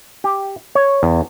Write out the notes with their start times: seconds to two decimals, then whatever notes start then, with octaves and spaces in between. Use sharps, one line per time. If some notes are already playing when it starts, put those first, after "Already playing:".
0.24 G4
0.75 C#5
1.03 E2